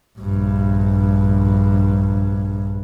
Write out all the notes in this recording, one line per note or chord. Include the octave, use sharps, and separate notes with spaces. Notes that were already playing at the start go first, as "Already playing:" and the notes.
A#1 G2